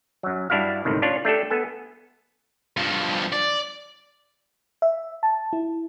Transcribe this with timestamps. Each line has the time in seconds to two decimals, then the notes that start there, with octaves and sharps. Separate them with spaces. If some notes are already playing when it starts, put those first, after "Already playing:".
0.23 F#2 F#3
0.50 G2 D4 E4 F#4 F5
0.85 C#2 A2 C3 D#3
1.02 C#4 D4 F4 C#5
1.25 A3 D4 G4 A4
1.50 B3 A4 G#5
2.77 G2 F3
3.33 D5
4.82 E5
5.23 A5
5.53 E4